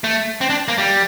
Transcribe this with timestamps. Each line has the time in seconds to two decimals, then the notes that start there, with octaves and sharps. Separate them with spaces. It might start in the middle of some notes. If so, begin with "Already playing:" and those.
0.04 A3
0.41 C4
0.50 D4
0.68 A#3
0.78 G3